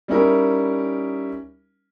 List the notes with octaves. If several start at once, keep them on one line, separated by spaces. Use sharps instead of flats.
G3 C#4 D#4 E4 A#4